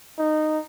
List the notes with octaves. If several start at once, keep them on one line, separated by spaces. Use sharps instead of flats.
D#4